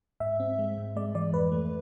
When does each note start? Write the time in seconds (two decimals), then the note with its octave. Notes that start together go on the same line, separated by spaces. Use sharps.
0.20 G#2 E5
0.40 C4
0.59 G#3
0.78 G#2
0.96 G#3 D5
1.15 E3 D5
1.33 F2 B4
1.52 A3